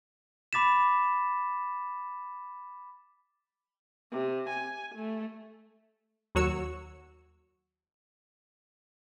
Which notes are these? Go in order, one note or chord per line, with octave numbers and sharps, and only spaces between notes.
B5 D6 A6 B6 E7
C3
G#5
A3
D#2 F#3 F#4 C#5 E6 C#7